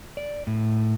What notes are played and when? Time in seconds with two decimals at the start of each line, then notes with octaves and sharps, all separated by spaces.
0.17 D5
0.47 A2